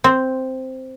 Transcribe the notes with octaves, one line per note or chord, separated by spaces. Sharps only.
C4